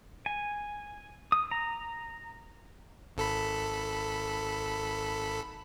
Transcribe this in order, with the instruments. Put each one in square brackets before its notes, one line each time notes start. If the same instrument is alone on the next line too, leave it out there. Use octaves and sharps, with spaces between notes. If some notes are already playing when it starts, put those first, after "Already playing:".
[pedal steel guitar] G#5
D#6
A#5
[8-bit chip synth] G#1 A4 B5